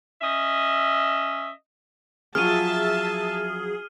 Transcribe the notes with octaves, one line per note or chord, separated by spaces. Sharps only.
C#4 D#5 E5
F3 F#3 C#4 G#4 E5 A5 F6 D#7